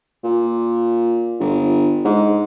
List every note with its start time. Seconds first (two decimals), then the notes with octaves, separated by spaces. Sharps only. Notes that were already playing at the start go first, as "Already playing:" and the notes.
0.24 A#2
1.40 G1
2.05 G#2